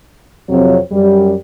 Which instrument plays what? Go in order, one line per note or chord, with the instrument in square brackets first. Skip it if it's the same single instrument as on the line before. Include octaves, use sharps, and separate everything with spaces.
[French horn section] F2 C3 F#3 C4 C#5
F#2 G3